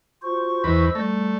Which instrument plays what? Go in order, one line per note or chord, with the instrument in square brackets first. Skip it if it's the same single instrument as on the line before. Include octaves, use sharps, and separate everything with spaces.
[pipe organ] F4 F#4 C5 [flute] C#6
[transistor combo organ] E2 B4 [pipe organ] C5 D#5 E6
[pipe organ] G3 [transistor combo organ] A3